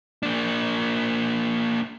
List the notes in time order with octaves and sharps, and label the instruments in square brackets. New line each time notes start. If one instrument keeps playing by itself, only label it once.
[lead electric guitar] A#3 D4